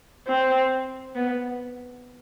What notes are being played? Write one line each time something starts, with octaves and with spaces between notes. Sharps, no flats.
C4
B3